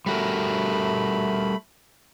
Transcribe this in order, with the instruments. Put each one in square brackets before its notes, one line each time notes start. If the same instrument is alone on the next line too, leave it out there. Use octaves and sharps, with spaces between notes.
[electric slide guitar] G3 F#4 A#4 [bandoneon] A3 B5